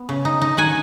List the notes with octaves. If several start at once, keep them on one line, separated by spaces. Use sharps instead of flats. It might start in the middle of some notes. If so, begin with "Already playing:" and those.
Already playing: B3
C#3
D#4
D#4
D#3 F#5 G#5